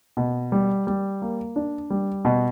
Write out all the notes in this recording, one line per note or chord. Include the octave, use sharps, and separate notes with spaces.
B2
G3
G3
A#3
D4
G3
B2